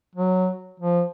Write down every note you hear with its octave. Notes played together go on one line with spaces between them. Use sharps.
F#3
F3